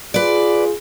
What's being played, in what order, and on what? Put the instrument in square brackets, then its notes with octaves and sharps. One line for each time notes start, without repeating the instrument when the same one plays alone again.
[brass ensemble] F4 G#4 [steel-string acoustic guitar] B4 D5